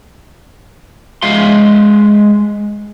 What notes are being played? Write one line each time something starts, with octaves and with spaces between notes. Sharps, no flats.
G#3 E5 F5 C6